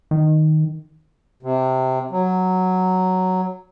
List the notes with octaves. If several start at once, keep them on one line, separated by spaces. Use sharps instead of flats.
D#3
C3
F#3